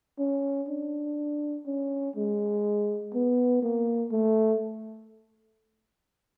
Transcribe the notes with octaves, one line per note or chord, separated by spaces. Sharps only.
C#4
D4
C#4
G#3
B3
A#3
A3